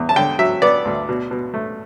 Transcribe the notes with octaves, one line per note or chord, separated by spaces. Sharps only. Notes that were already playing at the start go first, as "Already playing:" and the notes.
Already playing: E2
A5
D3 G5
F#3 E5
B3 D5
D2
B2
B2
A3